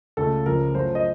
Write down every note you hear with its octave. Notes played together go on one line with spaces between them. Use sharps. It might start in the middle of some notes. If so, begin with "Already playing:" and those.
C#2 C#3 A3 A4
C#2 C#3 F3 A#4
F#2 F3 A3 C5
D#5